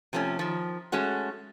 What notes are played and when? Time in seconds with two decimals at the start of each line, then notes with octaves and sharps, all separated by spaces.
0.13 C3 F3 A3 B3 C#4
0.39 D#3 F3
0.92 G#3 A3 C#4 F#4